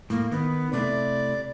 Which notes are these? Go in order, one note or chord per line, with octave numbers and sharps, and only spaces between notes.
A2 A#3
D#3 B3
C3 A3 E4 D5